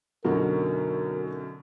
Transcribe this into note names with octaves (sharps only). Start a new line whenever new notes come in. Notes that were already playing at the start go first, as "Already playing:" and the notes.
F#2 B2 D3 F#3 D#4 A#4